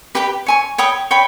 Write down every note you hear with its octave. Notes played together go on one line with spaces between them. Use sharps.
G4 B4 G5 B5
C#5 G#5 C#6
C#5 G5 B5 D#6
C#5 G5 B5